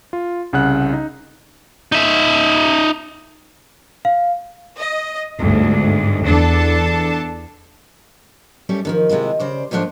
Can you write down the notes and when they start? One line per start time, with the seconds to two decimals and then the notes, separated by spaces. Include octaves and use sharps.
0.13 F4
0.53 C2 C#3 F#5 F#6
0.93 D#4
1.92 D#4 E5
4.05 F5
4.80 D#5
5.40 G1 D2 G#2
6.24 E2 D4 A4 A5
8.69 G3 A3 C#4 G4
8.85 D3 D#3 F3
9.09 C3 G#3 E4 F4
9.40 C#3 C5 D5
9.71 D#2 G#2 F3 A3 D4 C5